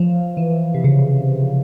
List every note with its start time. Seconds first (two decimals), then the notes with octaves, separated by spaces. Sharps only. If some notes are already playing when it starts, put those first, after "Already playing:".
Already playing: F3
0.37 E3
0.74 C3
0.84 C#3